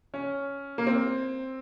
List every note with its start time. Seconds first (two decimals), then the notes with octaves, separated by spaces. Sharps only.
0.14 C#4
0.78 A#3
0.87 C4